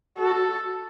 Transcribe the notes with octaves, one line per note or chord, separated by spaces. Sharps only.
F#4 A4